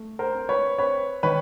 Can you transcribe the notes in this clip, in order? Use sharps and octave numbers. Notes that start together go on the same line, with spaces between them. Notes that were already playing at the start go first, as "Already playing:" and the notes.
Already playing: A3
A#4 C5
C4
B4 C#5
C4 B4 C#5
D#3 B4 C#5